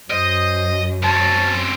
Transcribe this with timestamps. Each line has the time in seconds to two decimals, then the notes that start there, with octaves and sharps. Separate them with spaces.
0.10 F#2 C5 D#5
1.04 C4 C#4 A5